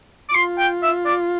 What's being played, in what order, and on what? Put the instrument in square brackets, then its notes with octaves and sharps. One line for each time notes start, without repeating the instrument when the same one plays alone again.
[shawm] D6
[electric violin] F4 [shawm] C6
[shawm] G5
E5
D5